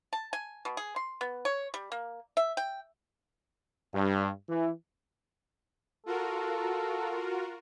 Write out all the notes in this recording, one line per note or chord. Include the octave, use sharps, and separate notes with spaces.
A5
G#5
B2
G#4
C6
B3
C#5
G3
A#3
E5
G5
G2
E3
F4 F#4 A4 A#4